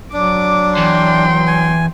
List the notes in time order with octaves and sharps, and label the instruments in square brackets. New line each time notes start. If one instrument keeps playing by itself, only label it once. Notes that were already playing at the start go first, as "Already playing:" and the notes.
[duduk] F#3 [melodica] D4 [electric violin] D6
[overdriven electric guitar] E2 [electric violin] G5 C6
[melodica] G#5